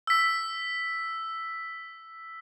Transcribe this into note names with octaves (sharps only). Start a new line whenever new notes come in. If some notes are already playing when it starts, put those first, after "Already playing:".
E6 B6